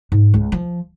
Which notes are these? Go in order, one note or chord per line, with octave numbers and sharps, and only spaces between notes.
G#2
C#2
F3